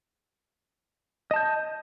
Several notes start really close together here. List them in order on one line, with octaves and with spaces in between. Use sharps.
D#5 A5 G6